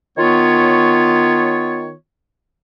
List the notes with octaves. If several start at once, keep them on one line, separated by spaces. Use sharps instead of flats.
D#3 B3 F4 C#5